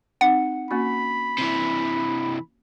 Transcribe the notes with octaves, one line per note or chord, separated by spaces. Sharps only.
C4 D#4 F#5
A#3 C#4 F#4 B5
C3 E3